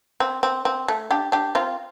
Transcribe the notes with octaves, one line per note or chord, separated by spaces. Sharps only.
C4
C4
C4
A3
D4 G4
D4 G4
C4 F4